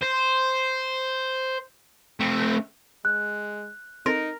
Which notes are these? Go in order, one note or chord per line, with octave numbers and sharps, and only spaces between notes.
C5
A3 C4
G#3 F#6
C4 D#4 A4 A#4